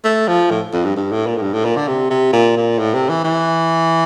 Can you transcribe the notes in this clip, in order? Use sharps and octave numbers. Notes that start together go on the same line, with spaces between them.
A3
F3
A2
F2
G2
G2
A2
A#2
A2
G2
A2
A#2
D3
C3
C3
A#2
A#2
A2
C3
E3
E3